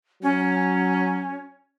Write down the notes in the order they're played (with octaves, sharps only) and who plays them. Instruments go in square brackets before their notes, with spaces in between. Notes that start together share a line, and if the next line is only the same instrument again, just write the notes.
[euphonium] F#3 [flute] C#4